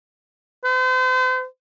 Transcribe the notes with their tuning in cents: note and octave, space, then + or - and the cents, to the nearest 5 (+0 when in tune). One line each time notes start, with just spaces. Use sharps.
C5 -40